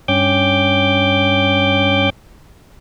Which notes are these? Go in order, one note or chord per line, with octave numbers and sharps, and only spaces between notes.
G2 C#4 G5 D6 G6